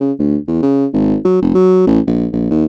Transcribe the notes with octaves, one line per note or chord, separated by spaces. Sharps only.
C#3
D2
E2
C#3
G#1
F#3
F1
F#3
A1
A#1
A#1
D#2